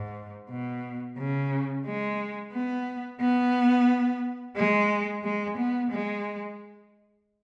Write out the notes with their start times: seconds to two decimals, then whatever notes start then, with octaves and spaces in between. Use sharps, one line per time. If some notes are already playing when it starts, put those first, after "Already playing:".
Already playing: G#2
0.50 B2
1.17 C#3
1.86 G#3
2.53 B3
3.20 B3
4.56 G#3
5.23 G#3
5.57 B3
5.91 G#3